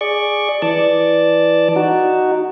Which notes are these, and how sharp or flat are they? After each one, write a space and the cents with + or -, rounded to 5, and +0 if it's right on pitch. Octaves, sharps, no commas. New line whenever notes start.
G#4 +0 D5 +10 C#6 +0
E3 +0 D5 +0 A5 +0
D#4 -5 F#4 +5